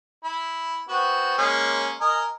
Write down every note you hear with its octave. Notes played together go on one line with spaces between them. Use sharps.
E4
B3 C4 F#4
G#3 A#3 C#4
A#4 D#5 G#5